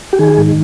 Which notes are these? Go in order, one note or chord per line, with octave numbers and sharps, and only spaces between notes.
G4
D#3 G#4
G#2